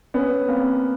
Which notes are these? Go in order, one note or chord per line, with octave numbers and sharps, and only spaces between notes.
B3 C#4
A#3 C4